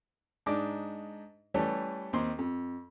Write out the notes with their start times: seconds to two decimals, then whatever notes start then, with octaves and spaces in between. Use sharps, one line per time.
0.46 G#2 D4 D#4 D6
1.54 E3 G3 A3 C#4 G4 A4
2.13 D#2 C4 C6
2.39 F2